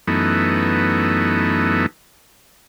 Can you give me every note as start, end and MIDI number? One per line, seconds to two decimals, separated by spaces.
0.08 1.86 42
0.08 1.86 52
0.08 1.86 57
0.08 1.86 59
0.08 1.86 63